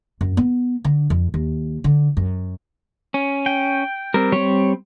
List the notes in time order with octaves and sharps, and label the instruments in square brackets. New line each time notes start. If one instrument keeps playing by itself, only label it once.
[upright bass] F#2
B3
D3
F2
D#2
D3
F#2
[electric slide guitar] C#4
[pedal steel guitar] G5
[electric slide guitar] G3 C4 [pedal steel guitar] A#4
[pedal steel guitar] G3 C4 [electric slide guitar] C#5